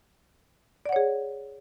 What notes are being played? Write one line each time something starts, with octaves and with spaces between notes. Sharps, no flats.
G#4 C#5 D5 F#5